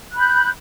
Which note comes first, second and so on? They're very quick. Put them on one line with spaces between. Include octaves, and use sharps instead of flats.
F#6 B5 G6